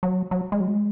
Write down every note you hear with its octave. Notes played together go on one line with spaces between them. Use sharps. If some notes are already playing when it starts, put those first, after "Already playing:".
F#3
F#3
G#3
F#3
G#3